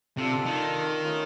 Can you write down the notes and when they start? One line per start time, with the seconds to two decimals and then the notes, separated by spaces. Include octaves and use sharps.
0.17 C3 D4 F4 A4
0.46 D#3
1.04 A3 C#4 F4